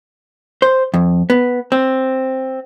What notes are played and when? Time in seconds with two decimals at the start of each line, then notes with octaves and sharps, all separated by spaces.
0.62 C5
0.94 F2
1.30 B3
1.72 C4